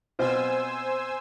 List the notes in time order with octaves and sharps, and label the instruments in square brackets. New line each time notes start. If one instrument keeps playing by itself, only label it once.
[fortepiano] B2 C4 F4 [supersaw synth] C5 G#5 E6